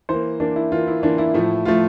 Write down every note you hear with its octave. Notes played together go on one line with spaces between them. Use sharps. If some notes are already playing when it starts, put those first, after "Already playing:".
E3 A#3 C5
E3 A#3 D4
E4
E3 A#3 F4
E4
E3 A#3 D4
E4
A2 F3 A3
A2 F3 A3 F4